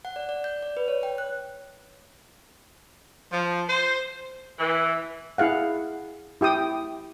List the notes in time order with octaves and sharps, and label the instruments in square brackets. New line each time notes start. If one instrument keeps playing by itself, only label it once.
[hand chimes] F#5
D5
D5
G6
D5
B4
C#5
G5
F#6
[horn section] F3
C5
E3
[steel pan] E4 G#4 F5 F#5
E4 G4 G5 D#6